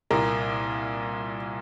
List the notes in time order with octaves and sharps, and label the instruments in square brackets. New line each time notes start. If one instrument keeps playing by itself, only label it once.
[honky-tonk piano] C2 A#2 A#4